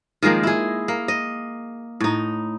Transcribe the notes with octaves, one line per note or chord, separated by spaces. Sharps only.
D#3 F3 G#3 A#3
E4 G#4
A#3
D#5
A2 D#4